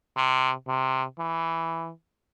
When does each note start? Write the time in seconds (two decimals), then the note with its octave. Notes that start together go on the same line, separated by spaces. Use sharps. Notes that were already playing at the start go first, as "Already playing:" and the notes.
0.16 C3
0.68 C3
1.19 E3